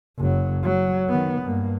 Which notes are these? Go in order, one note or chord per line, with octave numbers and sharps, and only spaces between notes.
F#1 F#3
F#3
D#3 B3
G2 A#3